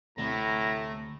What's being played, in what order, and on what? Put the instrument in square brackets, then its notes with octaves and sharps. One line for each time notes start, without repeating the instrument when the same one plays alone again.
[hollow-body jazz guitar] D2 C3 [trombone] A2 [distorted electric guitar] A3 [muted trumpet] A#5